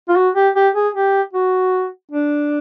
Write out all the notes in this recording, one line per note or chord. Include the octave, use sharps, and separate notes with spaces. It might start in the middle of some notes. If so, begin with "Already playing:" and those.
F4
F#4
G4
G4
G#4
G4
F#4
D4